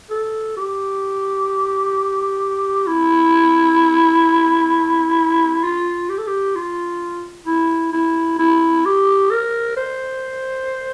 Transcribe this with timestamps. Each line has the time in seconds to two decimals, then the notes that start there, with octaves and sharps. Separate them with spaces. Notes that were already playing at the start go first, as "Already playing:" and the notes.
0.11 A4
0.57 G4
2.87 E4
5.63 F4
6.10 G4
6.18 A4
6.27 G4
6.56 F4
7.46 E4
7.93 E4
8.39 E4
8.85 G4
9.30 A#4
9.77 C5